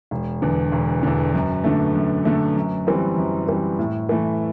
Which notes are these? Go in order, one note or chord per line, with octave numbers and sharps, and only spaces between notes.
E1
E2 D3
E1
E2 D3
F#2
D3 A3
F#2
D3 A3
F#2
E3 G3 C4
F#2
E3 G3 C4
A2
E3 A3 E4